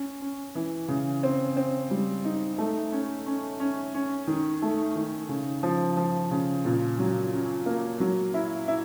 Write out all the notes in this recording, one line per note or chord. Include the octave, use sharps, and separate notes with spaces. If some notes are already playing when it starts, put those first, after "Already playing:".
Already playing: C#4
C#4
E3
C#3
C4
C4
G3
D#4
A3
C#4
C#4
C#4
C#4
D#3
A3
D#3
C#3
F3
F3
C#3
A#2
F#3
C#4
A#3
F#3
E4
E4